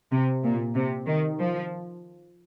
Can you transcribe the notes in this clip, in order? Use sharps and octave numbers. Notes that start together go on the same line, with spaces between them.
C3
A#2
C3
D#3
F3